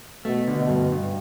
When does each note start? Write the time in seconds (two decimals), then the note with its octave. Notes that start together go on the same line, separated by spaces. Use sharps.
0.25 B2 A3
0.48 D3
0.58 B2
0.69 G2
0.92 G2